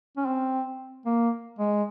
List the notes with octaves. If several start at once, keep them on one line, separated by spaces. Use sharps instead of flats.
C#4
C4
A#3
G#3